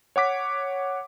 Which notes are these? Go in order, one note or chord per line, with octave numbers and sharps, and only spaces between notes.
C#5 F#5 D6 B6